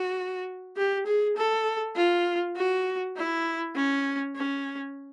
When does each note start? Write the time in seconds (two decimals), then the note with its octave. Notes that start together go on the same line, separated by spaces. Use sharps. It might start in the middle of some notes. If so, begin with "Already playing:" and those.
Already playing: F#4
0.77 G4
1.06 G#4
1.37 A4
1.96 F4
2.56 F#4
3.17 E4
3.76 C#4
4.36 C#4